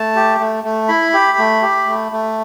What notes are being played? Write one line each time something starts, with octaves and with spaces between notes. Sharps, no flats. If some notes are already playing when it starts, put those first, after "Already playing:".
Already playing: A3 A5
G4
A3
A3
E4 B5
G4
A3
G4
A3
A3